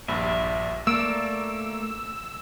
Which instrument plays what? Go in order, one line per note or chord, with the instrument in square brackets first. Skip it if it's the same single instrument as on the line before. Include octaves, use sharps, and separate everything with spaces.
[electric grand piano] A#1 G2 [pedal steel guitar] E5
[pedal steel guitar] A3 D5 [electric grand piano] A#3 D7 [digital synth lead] E6